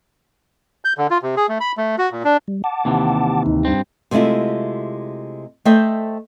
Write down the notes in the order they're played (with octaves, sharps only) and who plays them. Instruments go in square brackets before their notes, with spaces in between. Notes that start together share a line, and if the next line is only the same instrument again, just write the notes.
[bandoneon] G6
D3
F4
C3
G#4
A3
B5
A3
F#4
A#2
D4
[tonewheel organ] G3
F#5 A5 D6
[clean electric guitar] D#2 C3 E3
[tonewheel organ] D2 D#4
[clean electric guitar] G2 C4
[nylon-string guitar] C3 G#3 A3 E4 F4
A3 C5 D#5 E5 G5